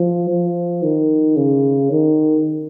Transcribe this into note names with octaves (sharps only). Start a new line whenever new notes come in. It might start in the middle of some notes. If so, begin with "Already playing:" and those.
Already playing: F3
F3
D#3
C#3
D#3